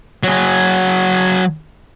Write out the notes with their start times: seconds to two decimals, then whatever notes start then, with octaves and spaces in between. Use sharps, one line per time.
0.23 F#3 G#4